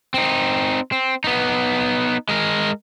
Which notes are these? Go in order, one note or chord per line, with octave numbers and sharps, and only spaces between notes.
C4 D#4
C4
B3 D#4
G#3 A#4